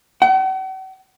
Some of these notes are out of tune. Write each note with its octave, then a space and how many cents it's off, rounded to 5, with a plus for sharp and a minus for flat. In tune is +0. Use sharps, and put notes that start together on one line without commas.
F#5 +45